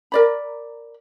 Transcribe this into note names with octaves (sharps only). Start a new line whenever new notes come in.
A#4 D5 B5